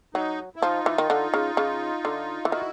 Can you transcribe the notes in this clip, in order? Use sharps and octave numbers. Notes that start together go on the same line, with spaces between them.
F#3 D#4
E4
F3 D#4 F4
E3
D#3
D3
C#3
C#3
D3
E3
D#3 E4 F#4